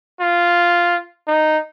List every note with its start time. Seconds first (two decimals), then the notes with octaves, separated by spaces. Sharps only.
0.21 F4
1.28 D#4